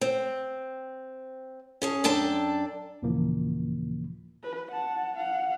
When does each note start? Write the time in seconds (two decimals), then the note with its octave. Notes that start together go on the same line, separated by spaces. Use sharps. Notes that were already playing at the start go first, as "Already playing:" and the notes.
0.01 C4
1.82 C#4 G#4 A5
2.04 F#2 D4 A4 G5 A5
3.02 D#2 A#2 C#3 E3 F3 A#3
4.43 B4
4.71 F#5 A5
5.17 F5 F#5